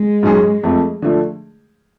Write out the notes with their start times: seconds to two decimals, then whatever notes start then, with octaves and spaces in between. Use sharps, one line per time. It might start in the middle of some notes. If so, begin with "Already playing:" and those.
Already playing: G#3
0.23 G#2 F#3 C#4 G#4
0.63 F2 F3 A3
1.02 D3 F3 A3